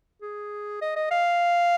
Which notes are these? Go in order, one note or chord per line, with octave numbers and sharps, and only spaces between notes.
G#4
D#5
D#5
F5